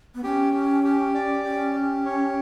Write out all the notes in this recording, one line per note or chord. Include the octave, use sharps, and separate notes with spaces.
B3
C#4 G4
G4
G4
D5
C#4 G4
G4
C#5